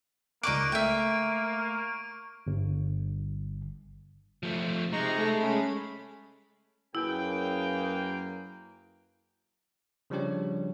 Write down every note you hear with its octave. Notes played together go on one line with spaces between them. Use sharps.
C#2 A#3 D#4 D5 C#6 D6 F#6 D7
A3 E5 G5
G1
F3 A3
C3 G#3 D#4 A#5 C#6
A3
C#4 B5
F#2 F#3 A#3 E4 G#4 B4 G5
C#3 F3 G3 D4 G4 C#5